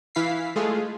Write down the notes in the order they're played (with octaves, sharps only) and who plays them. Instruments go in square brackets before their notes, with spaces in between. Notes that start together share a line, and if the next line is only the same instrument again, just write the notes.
[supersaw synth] E3 E4 F5 B6 C7
G#3 A3 F4 G#4